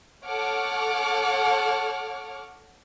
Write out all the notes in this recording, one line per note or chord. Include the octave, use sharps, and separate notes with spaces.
A4 C#5 F#5 D6 F6